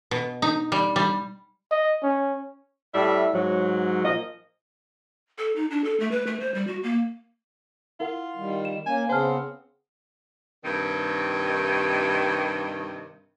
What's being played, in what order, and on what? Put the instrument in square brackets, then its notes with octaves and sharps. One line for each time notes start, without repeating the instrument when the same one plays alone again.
[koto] B2
D#4
G3
G3
[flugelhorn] D#5
C#4
[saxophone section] A2 G3 E5
G#2 F#3
A#2 F3 D#5
[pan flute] A4
D#4
D4
A4
A3
B4
A3
C5
G3
F#4
A#3
[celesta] E4 A#4 F#5 [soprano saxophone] F4
[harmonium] D#3 G3
[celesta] E7
[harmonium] A#3 C#4 [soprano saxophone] G#5
[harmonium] C#3 B3 C4 [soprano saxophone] C5 [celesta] G#5 A5 F6
[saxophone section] G2 C3 D#3